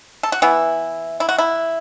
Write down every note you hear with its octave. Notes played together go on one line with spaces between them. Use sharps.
A4
F#4
E3 B3 E4
E4
F#4
E4